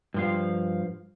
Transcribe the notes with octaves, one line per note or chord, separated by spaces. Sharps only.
G2 F3 F5